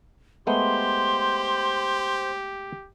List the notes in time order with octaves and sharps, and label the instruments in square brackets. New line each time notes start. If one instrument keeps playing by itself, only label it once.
[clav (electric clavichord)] G#3 A3 B3 [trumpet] G4 [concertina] C5 [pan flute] C6